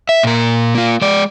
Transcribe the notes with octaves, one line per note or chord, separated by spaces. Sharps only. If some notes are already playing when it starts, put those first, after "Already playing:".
E5
A#2 A#4
A#3 F4
G#3 D5